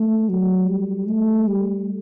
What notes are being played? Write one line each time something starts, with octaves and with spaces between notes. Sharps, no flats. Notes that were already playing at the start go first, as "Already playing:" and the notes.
Already playing: A3
F#3
G3
A3
G3